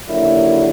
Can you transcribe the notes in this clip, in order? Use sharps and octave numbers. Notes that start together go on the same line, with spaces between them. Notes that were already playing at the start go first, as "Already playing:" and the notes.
D#2 D3 F#3 A#3 E4